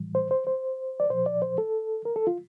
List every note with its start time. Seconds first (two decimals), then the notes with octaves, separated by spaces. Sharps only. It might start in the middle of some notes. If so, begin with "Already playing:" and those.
Already playing: A2 E3 G3
0.15 C5
0.31 C5
0.47 C5
1.00 D5
1.10 A#2 F3 C5
1.26 D5
1.42 C5
1.58 A4
2.05 A#4
2.16 A4
2.27 F4